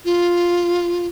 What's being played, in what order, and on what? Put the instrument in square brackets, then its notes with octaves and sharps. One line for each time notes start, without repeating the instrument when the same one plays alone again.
[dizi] F4